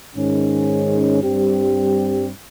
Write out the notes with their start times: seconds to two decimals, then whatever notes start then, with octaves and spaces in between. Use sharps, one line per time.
0.15 G#2 D#3 G#3 C#4
1.23 G2 G3 C4 G4